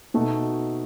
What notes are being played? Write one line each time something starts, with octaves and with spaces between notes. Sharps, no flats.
B2 A3 D#4 F#4